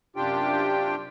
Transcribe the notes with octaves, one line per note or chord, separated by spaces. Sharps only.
F#2 C3 D4 F4 G4 G5